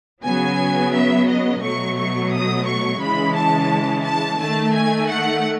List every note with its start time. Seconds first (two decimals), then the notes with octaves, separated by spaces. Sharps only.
0.23 C#3 F#3 B3 G#5
0.93 E5
1.28 D#5
1.62 B2 F#3 A3 C#6
1.97 C#6
2.32 D#6
2.66 C#6
3.01 C#3 E3 G#3 B5
3.35 A5
4.04 A5
4.38 D#3 A3 A5
4.74 G#5
5.08 F#5